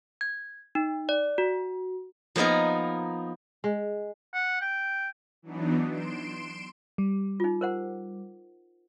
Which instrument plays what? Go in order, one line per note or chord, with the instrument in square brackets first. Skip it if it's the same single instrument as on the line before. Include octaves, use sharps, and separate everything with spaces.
[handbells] G#6
D#4
D5
F#4
[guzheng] F3 A#3 B3 D#4 A#4
[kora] G#3
[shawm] F#5
G5
[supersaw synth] E3 F#3 B3 D4 D#4
C6 D7 E7
[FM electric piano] G3
[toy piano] D#4 F4
A#4 C5 F#5